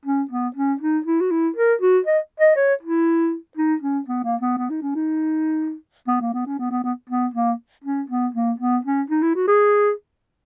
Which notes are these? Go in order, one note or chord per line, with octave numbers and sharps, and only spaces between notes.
C#4
B3
C#4
D#4
E4
F#4
E4
A#4
F#4
D#5
D#5
C#5
E4
D#4
C#4
B3
A#3
B3
B3
D#4
C#4
D#4
B3
A#3
B3
C#4
B3
B3
B3
B3
A#3
C#4
B3
A#3
B3
C#4
D#4
E4
F#4
G#4